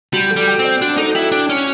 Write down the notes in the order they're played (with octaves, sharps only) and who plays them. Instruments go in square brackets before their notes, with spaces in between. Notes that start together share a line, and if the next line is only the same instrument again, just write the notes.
[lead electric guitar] G3 [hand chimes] F#4
[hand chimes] A4
[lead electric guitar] G3
[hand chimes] G5
[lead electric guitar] C4
[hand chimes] D5
[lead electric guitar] D4 [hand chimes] F#4
[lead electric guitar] D#4 [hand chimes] A4
[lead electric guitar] E4 [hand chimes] G5
[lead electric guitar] D4 [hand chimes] D5
[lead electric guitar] C#4 [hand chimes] F#4